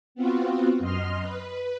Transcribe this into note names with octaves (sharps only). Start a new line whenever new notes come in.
B3 C4 F4 F#4
F#2 D#5 C6 F6
B4